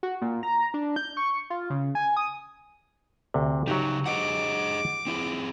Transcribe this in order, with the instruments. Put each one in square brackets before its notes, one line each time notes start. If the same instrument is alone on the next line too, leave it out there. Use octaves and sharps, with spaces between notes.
[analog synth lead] F#4
A#2
A#5
D4
G6
C#6
F4
C#3
G#5
D#6
[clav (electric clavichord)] D2 C3
[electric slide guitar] C#3 D#4 [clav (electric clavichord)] F#3 F#4 G4
[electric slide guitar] G#4 D#5 F#5 [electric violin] D6
[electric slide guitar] C4 E4 G#4